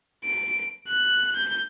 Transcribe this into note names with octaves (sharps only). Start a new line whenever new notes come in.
D7
F#6
G6